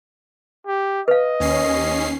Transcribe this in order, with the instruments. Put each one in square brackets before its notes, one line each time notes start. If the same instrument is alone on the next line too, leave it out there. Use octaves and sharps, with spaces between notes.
[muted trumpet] G4
[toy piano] B4 F5 [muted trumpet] D#5
[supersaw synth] D#2 C#4 C7